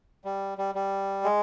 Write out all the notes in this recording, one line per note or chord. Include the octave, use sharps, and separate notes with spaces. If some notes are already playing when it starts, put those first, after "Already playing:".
G3
G3
G3
G#3